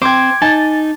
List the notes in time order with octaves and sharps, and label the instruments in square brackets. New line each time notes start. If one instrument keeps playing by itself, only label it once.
[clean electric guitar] C4 [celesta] G5 C6 C7 [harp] D6 G#6
[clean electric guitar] D#4 [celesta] G#5 A6 [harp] A5